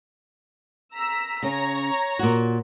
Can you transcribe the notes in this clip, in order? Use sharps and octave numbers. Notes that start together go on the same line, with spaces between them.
A#5 E6 B6
C#3 C#4 C#5 A#5
A#2 F#4